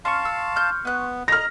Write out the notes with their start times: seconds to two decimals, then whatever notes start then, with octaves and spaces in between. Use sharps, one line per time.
0.05 C#4 F5 A5 C6 C#6
0.25 E6
0.56 F6 G6
0.85 B3 B4 F#6
1.28 D#5 A#5 F6 A#6